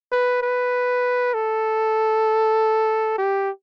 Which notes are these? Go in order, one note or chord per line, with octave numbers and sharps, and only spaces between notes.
B4
B4
A4
G4